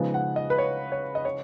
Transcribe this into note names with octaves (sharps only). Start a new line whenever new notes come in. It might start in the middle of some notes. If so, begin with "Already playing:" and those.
Already playing: C#3 F3 G#3 B3 D#4
F#5
D#5
B4
C#5
C#5
D#5
C#5